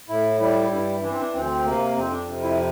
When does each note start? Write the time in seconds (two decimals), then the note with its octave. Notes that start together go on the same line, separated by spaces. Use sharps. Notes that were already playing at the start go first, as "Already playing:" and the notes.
0.09 A2 E4
0.41 G3 E4
0.71 G2 E4
1.03 E3 D4
1.11 C4
1.20 D4
1.34 D2 C4
1.65 C3 A#3
1.96 F2 C4
2.12 D4
2.28 C3
2.43 E4